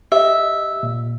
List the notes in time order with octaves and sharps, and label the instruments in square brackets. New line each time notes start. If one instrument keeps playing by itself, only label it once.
[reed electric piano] G4 D#5 [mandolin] E5
[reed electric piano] A#2